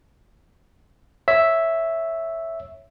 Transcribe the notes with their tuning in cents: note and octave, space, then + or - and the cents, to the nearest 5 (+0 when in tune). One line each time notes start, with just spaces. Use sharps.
C#5 +0 E5 +0